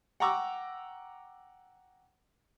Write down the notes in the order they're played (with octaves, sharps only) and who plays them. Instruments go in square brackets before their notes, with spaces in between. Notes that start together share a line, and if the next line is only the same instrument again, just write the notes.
[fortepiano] F#5 G5 A#5 C#6 D6 E6